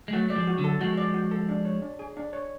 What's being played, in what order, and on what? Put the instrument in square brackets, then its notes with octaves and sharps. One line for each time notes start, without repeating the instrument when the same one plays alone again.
[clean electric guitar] G#3
[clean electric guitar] F#3 A3 [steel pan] F#4
[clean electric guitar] A3 [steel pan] D5
[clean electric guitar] F3 G#3
[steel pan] F#4
[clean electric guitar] D3 F#3
[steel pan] A4
[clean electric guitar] F3 G#3 [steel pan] F#4
[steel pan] D5
F#4
A4
D4
C#5
D4
G#4
D4
C#5